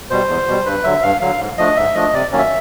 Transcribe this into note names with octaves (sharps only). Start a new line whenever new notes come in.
B2 G3 C5
E2
B2 G3
G2 B4
D3 F#3 E5
G2 F5
D3 F#3 F5
G#2
F3 A3 D4 D#5
G#2 E5
F3 A3 D4 D#5
C3 D5
D#3 F#3 A#3 C#4
E5